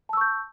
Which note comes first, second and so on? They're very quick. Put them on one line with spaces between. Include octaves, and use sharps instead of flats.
A5 E6 C#6 G6